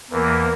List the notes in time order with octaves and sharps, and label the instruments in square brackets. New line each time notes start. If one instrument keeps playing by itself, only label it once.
[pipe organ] E2 E3 A#3 [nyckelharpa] A#4